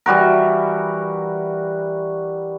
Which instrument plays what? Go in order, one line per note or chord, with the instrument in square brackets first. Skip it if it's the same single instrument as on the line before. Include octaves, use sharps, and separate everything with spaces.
[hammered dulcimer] E3 G3 F#4 A#4